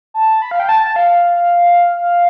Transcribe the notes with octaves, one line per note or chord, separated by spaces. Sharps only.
A5
B5
F5
G5
A5
F5